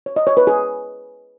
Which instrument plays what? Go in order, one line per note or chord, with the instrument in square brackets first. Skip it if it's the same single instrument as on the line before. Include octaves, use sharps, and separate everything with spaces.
[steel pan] C#5
D#5
C#5
B4
G#4